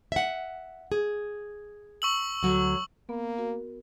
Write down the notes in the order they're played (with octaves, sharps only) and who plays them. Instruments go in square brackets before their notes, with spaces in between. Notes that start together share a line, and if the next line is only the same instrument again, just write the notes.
[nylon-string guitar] E5 F#5
G#4
[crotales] C#6 E6 F#7
[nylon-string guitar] D2 F#3
[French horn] A#3 [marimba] B3
[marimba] F#4 A#4